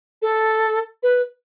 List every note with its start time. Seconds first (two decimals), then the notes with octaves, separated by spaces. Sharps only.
0.21 A4
1.02 B4